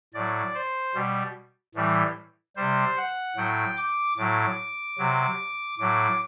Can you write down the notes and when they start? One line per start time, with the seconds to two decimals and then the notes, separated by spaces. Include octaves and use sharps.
0.14 A2 F#3 D5
0.55 C5
0.95 B2 G3
1.75 A2 E3 G3
2.56 C3 G3 C5
2.97 F#5
3.36 A2 F#3 G5
3.77 D6
4.17 A2 F#3 D6
4.98 C3 F#3
5.78 A2 F#3 D6